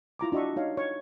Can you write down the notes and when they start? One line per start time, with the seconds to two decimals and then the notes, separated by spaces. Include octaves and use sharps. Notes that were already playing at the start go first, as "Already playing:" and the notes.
0.19 E4 F4 A#5 D6
0.32 D4 F#4 D#5 E5 C#6
0.56 D#4 C#5 F5
0.77 C#5 C#6